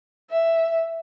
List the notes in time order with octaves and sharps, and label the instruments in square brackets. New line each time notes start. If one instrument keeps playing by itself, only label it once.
[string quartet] E5